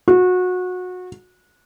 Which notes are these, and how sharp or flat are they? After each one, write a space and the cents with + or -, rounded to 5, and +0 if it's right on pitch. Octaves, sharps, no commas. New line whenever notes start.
F#4 -25